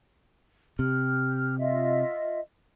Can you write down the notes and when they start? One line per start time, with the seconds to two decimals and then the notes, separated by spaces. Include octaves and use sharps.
0.79 C3 G4 F6
1.58 F4 D#5 E5